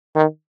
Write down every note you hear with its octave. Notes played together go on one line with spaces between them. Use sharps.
D#3